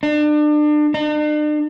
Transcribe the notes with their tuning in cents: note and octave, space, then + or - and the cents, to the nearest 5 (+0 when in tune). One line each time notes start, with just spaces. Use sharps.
D4 +35
D4 +45